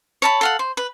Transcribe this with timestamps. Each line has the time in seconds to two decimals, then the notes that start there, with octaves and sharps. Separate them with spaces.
0.22 C#5 A5 B5
0.41 A4 F5 F#5
0.59 C5
0.77 B4